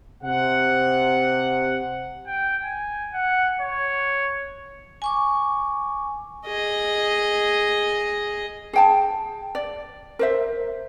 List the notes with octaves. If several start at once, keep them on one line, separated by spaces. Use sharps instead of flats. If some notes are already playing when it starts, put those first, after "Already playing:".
C3 F#5
G5
G#5
F#5
C#5
G#5 C#6 D6
G#4 D#5
G#4 G5 A5
D5
A#4 C5 E5